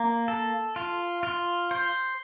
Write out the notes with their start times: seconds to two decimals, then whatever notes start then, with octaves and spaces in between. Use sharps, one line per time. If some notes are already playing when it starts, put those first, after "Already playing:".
Already playing: A#3
0.28 A4
0.76 F4
1.23 F4
1.71 C5